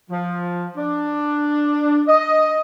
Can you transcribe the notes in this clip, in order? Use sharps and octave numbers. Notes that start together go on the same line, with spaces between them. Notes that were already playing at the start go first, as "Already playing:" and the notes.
F3
D4
D#5